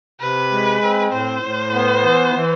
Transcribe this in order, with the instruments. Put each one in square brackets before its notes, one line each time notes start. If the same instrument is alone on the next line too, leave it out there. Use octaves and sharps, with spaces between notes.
[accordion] C3 [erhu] B4
[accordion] G#3
C4
[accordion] A2 [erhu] C5
[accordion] A2
B3
E3
E3